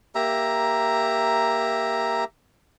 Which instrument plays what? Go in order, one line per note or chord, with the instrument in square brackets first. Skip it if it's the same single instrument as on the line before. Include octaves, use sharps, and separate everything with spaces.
[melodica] A#3 G4 E5 A#5